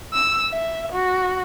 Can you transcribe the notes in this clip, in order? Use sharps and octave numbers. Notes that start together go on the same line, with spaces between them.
E6
E5
F#4